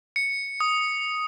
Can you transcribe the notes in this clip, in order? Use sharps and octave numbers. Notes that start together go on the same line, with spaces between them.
C#7
D#6